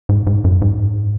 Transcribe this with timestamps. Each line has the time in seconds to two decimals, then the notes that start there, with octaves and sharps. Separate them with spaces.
0.09 G#2
0.27 G#2
0.44 F#2
0.62 G#2